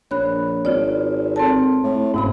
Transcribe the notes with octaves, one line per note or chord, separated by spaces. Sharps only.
A#1 C#5 B5 F#6
G#1 F4 C#5 D5
C4 A4 A5
A2
F#1 G#2 C3 B5